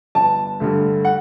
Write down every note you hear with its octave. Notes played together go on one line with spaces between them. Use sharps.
G1 A5
G2 D3 A3
F#5